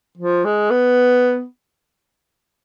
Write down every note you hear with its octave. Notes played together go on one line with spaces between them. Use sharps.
F3
G#3
B3